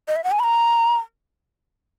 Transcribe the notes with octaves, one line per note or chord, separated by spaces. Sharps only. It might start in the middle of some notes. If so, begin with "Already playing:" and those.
D#5
E5
F#5
G#5
B5
A#5